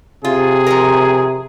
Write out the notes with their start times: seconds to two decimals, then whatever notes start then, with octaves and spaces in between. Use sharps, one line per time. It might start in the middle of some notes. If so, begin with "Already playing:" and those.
0.25 C3 F4 G#4
0.66 F3 A#4